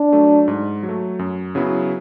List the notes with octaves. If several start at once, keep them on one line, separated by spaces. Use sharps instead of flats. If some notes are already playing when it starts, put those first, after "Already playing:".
Already playing: D4
F#3 A3
G#2
F#3
A3
F#2
C#3 F#3 B3 E4